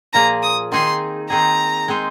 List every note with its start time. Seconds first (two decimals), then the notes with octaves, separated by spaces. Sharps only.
0.13 A#2 F3 A#3 G#4 A#5
0.43 D#6
0.72 D#3 C4 D#4 G#4 C6
1.30 D#3 C4 D#4 G#4 A#5
1.88 G#3 C4 D#4 C5